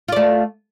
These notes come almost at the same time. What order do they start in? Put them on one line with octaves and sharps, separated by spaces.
F4 D5 A3